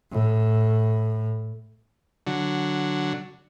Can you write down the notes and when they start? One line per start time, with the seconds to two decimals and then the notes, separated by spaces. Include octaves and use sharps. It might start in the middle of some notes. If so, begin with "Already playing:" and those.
0.12 A2
2.27 D3 F#3